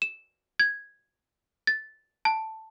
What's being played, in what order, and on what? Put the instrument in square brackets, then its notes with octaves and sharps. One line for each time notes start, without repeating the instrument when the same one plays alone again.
[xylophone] E7
G#6
A6
A5